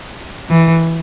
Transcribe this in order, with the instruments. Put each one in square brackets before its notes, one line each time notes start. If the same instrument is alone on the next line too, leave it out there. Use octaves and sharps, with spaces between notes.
[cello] E3